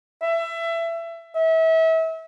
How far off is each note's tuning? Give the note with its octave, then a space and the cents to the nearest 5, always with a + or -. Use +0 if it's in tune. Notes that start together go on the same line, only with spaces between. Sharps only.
E5 +25
E5 -30